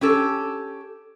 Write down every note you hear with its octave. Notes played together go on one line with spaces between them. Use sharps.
C#4 G4 A4